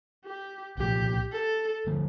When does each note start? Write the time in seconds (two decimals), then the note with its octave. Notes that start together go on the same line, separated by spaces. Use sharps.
0.25 G4
0.77 C2 A#2 F3 G4
1.32 A4
1.87 D3 F3 A3